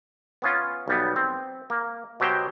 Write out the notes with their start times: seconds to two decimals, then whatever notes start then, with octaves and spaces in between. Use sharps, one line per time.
0.42 B3 C#4 F4
0.88 B1 G3 B3
1.16 C4
1.70 A#3
2.20 B2 F#3 G4 C5 G5